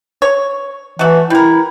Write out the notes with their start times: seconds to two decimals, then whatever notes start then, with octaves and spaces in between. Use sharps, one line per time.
0.22 C#5
0.99 E3 F#3 A3 F#4
1.30 G3 E4 A#4